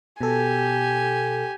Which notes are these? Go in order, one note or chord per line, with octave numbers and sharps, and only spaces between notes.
B2 G4 A4 G#5